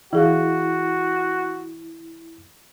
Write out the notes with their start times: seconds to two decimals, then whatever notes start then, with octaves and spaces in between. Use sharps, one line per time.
0.13 E3 E4 F#4 G#4 F5